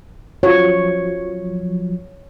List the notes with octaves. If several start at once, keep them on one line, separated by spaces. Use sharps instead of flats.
F3 F#3 C#5